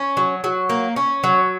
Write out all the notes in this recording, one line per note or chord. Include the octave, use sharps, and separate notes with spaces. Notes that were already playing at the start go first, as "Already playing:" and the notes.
Already playing: C#4
F#3
F#3
A#3
C#4
F#3